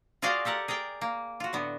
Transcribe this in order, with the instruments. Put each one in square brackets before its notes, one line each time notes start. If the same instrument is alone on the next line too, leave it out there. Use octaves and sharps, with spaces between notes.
[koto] F4 F#4 G#4 D5 D#5 F5
G4 A4 A#4 F#5
G#4 A#4 D5 G5
A#3
F4 F#4
A2 D3 B3